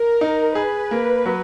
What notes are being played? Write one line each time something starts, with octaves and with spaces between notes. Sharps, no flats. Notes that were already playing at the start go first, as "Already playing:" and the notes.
Already playing: A#4
D#4
G#4 B4
A#3
F#3